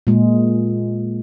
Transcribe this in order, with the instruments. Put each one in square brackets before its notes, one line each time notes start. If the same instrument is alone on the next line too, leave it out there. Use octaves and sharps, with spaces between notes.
[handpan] A#2 G#3